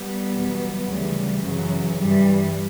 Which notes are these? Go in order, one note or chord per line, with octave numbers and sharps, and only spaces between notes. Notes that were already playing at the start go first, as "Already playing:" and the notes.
Already playing: G3 B3
E2 B2 F#3
D2 C#3 E3 G3
F#2 C#3 E3 F#3
G2 E3 G3